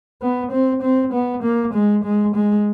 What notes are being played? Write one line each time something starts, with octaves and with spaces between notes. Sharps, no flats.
B3
C4
C4
B3
A#3
G#3
G#3
G#3